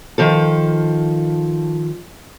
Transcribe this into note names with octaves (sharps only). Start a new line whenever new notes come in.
D#3 F3 A4